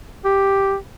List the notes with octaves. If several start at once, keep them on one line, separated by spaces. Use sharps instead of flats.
G4